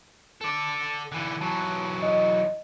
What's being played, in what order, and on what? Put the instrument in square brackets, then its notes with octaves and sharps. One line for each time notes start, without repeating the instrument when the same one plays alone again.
[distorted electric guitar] A4 D5
D3 E3
[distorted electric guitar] E3 F#3 [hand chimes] A5
[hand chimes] D#5